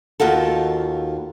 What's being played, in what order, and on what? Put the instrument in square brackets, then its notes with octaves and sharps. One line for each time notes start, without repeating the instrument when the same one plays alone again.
[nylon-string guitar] D#2 F4 F#4 A4